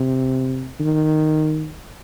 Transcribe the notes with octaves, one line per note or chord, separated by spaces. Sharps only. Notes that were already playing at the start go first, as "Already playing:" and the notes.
Already playing: C3
D#3